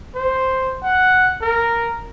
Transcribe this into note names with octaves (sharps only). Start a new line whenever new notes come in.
C5
F#5
A#4